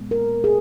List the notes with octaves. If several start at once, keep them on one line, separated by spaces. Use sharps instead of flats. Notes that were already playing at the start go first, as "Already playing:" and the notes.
Already playing: A#2 G#3 B3
A#4
G#4